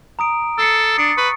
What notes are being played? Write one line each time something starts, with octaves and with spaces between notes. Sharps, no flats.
A#5 D#6 D7
A4 E6 C7 C#7
D4 D#6 A6 C#7
B4 C#6